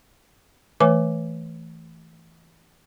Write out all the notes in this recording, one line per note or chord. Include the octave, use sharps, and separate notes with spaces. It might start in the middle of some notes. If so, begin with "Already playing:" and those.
E3 A3 B4 C#5 G#5 D6